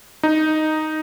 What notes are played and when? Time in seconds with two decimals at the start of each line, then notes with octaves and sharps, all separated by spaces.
0.23 D#4